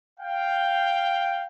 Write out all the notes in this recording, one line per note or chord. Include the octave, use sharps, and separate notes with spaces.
F5 G5